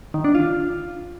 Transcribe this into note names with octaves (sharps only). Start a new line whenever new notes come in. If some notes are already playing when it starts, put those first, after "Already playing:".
D#3
D4
F4